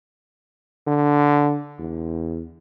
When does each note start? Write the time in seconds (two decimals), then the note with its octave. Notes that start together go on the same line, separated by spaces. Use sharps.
0.87 D3
1.79 E2